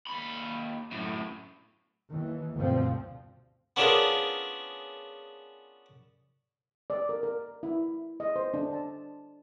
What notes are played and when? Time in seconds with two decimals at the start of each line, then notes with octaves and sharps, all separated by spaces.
0.07 D#2 B5
0.91 F#2 A2
2.10 D#2 E3
2.56 D2 G2 B2 D3 F3 C4
3.76 B3 C#4 D4 F4 G#4 A#4
6.90 D5
7.09 A#4
7.23 A#4
7.63 E4
8.20 D#5
8.36 C5
8.54 D4
8.73 A5